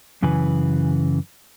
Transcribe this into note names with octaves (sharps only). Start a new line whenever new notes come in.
F#2 C#3 E3 B4 G#5